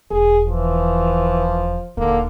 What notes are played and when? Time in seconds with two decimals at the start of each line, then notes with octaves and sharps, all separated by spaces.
0.11 E1 G#4
0.47 E3 F3
1.97 D#1 D3 A#3 D#4